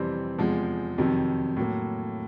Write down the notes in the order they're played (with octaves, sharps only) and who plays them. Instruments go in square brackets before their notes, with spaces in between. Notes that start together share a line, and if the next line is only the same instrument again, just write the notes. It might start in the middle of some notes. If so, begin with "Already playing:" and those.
Already playing: [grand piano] F2 C3 E3 G3 C4
E2 C3 F3 G#3
F2 C3 D#3 F#3
A2 F#3 A#3